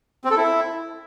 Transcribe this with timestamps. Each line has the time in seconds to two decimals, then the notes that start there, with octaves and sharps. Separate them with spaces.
0.25 C4
0.31 A4
0.37 E4